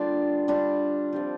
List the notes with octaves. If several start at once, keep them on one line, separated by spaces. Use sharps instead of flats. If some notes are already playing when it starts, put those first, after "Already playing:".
Already playing: D3 G3 A#3 D4 F4
G3 D4 F4
F3 C4 G4